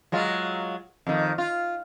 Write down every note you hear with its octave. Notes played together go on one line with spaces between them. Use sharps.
F#3 G#3 F4
F2 D#3
F4